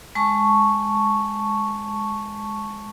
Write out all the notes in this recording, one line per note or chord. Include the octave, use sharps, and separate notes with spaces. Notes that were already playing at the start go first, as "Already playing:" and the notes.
G#3 A5 C#6